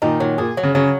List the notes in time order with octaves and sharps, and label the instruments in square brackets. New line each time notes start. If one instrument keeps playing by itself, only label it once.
[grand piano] A#2 D#3 [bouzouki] D#4
[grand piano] A#2 D#3 [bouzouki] F#3
[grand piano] A#2 [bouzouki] G#4
[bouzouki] F#3
[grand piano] C#3
[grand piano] C#3 [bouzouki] F#3